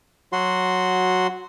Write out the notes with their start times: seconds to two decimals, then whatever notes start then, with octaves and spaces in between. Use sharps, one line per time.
0.33 F#3 F#4 C6